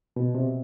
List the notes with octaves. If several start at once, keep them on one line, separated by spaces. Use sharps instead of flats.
B2
C3